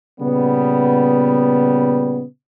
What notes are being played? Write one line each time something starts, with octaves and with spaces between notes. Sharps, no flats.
A#2 C#3 G3 B3